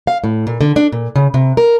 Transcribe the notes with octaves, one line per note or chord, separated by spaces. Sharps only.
F5
A2
A#2
D3
D4
A#2
C#3
C3
A#4